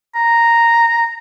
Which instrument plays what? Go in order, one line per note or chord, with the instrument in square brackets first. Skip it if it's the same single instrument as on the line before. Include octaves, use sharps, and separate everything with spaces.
[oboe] A#5